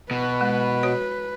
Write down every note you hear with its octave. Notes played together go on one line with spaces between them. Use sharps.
B2 B4
G#3
F#4 C#5